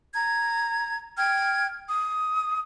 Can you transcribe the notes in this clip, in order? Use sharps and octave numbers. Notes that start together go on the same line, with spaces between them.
A#5 G#6
G5 F6 G#6
D#6